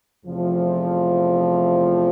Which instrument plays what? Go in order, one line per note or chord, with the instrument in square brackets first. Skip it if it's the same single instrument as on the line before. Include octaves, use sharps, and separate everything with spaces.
[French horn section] E2 C3 F3 A3